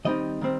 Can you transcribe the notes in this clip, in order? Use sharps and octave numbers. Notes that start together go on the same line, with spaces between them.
D#3 G3 C4 D#4 D#5
D#3 G3 C4